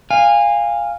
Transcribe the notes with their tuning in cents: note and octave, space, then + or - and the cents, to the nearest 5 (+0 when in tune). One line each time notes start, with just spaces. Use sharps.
F5 +0 G#5 -25